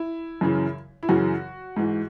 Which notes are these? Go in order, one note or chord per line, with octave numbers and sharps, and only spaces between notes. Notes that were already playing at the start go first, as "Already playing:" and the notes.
Already playing: E4
F#2 C#3 E3
E4
F#2 C#3 E3 F#4
G#2 E3